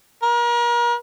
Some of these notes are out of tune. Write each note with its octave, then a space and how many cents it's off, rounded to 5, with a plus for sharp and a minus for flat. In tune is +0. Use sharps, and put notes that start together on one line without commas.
A#4 +35